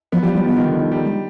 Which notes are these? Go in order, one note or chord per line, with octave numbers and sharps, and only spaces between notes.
F3 B3
F3 G3
F3 G3
D#3 B3
D#3
D3
D#3
G3
G#3